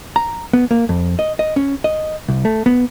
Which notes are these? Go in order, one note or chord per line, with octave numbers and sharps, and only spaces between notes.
A#5
B3
A#3
F2
D#5
D#5
C#4
D#5
C2
A3
B3